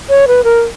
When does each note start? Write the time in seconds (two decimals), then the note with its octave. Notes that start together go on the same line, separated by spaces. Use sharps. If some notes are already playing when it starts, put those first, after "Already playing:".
0.10 C#5
0.28 B4
0.44 A#4